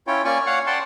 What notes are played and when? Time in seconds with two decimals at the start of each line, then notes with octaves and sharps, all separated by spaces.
0.07 C#4 E4 F4 C#5 G5
0.25 A#3 C#4 D5 G#5 C#6
0.47 C#5 F5 F#5
0.67 D5 F#5 G5 A5 C6